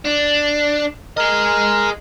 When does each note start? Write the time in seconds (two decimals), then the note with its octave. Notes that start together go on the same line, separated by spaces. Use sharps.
0.05 D4
1.17 G#4 A#4 D#5